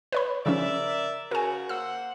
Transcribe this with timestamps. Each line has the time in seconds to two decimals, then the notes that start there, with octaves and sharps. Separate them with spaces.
0.12 B4 C#5 B5
0.46 C#3 F3 C#4 A#4 D5 E5
1.31 C#3 F#4 A#4 G#5
1.69 A#3 C5 F#5 E6